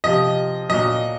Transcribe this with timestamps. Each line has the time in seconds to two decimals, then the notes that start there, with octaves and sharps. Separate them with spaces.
0.04 C3 F3 D#5
0.70 A#2 F#3 D#5